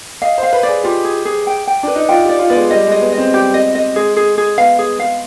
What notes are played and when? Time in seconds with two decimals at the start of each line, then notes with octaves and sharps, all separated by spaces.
0.22 D#5 F5
0.38 C5 F5
0.53 B4
0.63 D5
0.69 G#4
0.84 F4 G4
1.04 G#4
1.25 G#4
1.47 G5
1.67 G5
1.83 D4 B4
1.96 D#4
2.09 F4 G5
2.25 G4 D5
2.40 F4
2.50 B3 D5
2.55 G#3
2.71 G3 D#5
2.87 G#3 D#5
3.02 B3
3.12 D#5
3.18 C4
3.33 G3 G4
3.54 D#5
3.75 D#5
3.96 G#3 G#4
4.17 G#4
4.38 G#4
4.58 B3 F5
4.79 G#4
4.99 F5